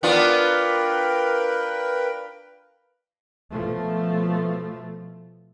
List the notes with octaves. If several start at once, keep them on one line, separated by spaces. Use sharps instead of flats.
B3 D4 F4 A#4 B4 G5
B2 F3 A3